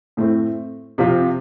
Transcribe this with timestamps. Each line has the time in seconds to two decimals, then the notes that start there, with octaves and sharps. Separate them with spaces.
0.17 A2 A3 C4
0.98 C3 F3 C4 F4